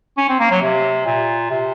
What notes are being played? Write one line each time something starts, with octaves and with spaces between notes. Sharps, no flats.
C#4
C4
A#3
F#3
C3
A#2
C3